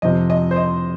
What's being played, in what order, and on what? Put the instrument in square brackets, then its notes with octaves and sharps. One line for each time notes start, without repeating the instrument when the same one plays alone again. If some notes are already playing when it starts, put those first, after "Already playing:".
[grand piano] F2 C3 F3 [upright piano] D#5
[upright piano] D#5
C5
D#5